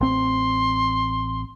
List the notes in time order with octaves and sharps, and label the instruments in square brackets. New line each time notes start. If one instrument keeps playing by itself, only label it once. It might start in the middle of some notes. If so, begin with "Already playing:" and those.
[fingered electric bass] A1 C4 [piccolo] C6